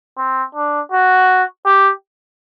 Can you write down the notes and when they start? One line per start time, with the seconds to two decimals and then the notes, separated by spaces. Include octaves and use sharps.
0.18 C4
0.55 D4
0.92 F#4
1.66 G4